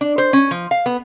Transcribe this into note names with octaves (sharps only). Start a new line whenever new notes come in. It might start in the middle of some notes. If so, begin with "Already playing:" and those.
D4
C5
C#4
F3
F5
B3